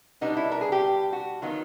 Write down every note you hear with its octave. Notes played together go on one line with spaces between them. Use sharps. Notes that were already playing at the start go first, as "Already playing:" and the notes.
B2 G3 B3 D4 D#4
E4
A#4
G#4
G4
F#4
D#3 F#3 B3 D#4 F4